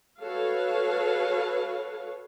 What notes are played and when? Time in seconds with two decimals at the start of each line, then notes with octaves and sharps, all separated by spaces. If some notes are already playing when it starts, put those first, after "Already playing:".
0.23 F#4 A4 B4 C#5 F5